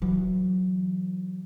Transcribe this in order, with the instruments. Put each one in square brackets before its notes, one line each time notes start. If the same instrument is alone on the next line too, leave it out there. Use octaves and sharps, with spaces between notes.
[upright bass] E3 F#3